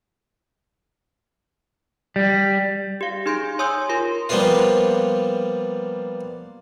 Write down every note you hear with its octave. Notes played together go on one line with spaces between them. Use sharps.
G3
G4 F5
D#4 G#4 C6 G6 A#6 D7
C#5 G#5 C6 D#6 E6 G6
F4 A#4 C6
F3 G3 A#3 B3 F4